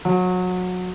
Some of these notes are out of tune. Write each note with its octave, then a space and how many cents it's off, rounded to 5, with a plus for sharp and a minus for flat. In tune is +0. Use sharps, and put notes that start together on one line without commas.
F#3 -25